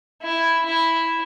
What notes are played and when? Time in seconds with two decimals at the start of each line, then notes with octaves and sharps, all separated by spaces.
0.22 E4
0.66 E4